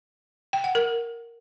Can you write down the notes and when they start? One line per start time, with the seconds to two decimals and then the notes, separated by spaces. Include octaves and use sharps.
0.53 G5
0.64 F#5
0.75 A#4